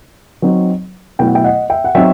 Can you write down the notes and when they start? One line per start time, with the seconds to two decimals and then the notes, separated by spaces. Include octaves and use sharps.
0.42 F#3 C4 D#4
1.19 B2 F#3 A3 E4 G5
1.27 F#5
1.35 E5 G5
1.44 D#5 F#5
1.70 E5 G5
1.84 F#5
1.95 F#3 C4 D#4 E5 G5